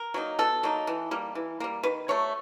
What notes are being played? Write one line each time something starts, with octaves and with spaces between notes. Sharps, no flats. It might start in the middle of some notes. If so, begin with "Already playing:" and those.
Already playing: A#4
F#3 A#3 D#4
B2 A4
F#3 A#3 D#4
E3
G3 A#3
E3
G3 A#3
D#3 B4
F#3 A3 C#5